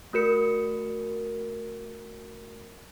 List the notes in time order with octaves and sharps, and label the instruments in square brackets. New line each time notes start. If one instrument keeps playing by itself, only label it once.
[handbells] A3 F#4 A#4 C#7